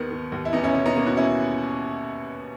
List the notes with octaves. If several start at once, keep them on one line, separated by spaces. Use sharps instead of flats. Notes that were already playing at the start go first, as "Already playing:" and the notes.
Already playing: D#2 D#3 B3
D#3
D#2
E4
E2 B3 D#4
C#4 E4
B2 C#4 E4
B3 D#4
B2 A#3 C#4
D#4 F#4
C#4 E4